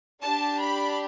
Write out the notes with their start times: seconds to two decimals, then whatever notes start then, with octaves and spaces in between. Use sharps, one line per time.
0.23 D4 G4 A5
0.61 B5